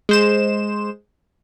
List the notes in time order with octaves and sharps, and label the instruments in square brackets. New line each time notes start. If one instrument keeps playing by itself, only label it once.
[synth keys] G#3 C5 E7